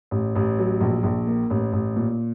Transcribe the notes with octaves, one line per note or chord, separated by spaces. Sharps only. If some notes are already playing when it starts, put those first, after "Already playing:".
A1
A1
F#3
A#1
A#1
A#3
A1
A1
A#2